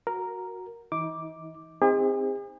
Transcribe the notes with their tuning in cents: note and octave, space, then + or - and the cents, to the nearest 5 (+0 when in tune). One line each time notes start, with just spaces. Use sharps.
F#4 -5 A#4 +0
E3 -15 D#4 +35 D6 +0
C4 +0 D#4 +20 G#4 -45